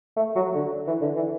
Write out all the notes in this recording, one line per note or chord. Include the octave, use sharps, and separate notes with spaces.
A3
F#3
D3
E3
D3
E3